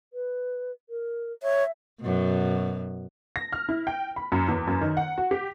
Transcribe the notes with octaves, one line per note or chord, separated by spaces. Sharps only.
B4
A#4
C#5 E5
F#2 B2
A#6
F6
E4
G5
B5
F#2
E2
F#2
D#3
F#5
F#4
G4